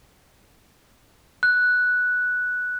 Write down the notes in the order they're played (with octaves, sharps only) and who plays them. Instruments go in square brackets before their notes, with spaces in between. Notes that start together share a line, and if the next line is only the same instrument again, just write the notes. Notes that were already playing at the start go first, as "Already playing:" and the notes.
[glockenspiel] F#6